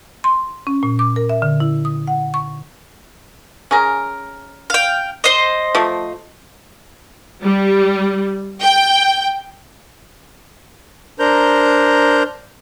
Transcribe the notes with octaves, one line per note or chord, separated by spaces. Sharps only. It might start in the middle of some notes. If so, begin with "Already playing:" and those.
C6
C#4
A#2
D6
A#4
E5
D3
E4
D#6
F#5
C#6
C#4 G#4 A#4
F5 G5
C5 D#5
F3 A3
G3
G5
D4 A#4 C5 A#5 G6